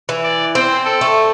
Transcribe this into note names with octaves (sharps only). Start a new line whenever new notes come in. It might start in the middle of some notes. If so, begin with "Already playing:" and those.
E3
D5
C4 C5
A4
A3